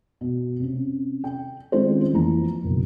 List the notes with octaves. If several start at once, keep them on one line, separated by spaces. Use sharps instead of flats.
B2
C3 C#4
G5
D#3 G#3 C4 C#4 F4 C5
F2 E3 F3 A#3 A#5
F#1 B1